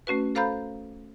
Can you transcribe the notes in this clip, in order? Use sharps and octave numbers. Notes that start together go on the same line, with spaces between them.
A3 C#4 F#4 B4
A4 C5 F5 A#5 B5 G6